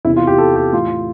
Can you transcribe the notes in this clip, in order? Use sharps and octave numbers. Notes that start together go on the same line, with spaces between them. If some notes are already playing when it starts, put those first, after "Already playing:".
E2 C3 E3 E4
F4
G4
A4
G4
A2 E3 F4